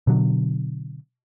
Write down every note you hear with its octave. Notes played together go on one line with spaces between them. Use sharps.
B2 D3 F#3